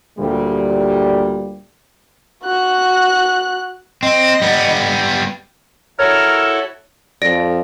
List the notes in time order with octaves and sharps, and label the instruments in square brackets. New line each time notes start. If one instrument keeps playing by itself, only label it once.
[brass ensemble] D2 A#2 G3
[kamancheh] F#4 F#6
[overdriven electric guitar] C4 [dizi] D#5
[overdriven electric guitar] G3 B3
[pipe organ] E4 F#4 A4 [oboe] A#4 [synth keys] C#5
[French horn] F2 [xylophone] D5 A#6 D7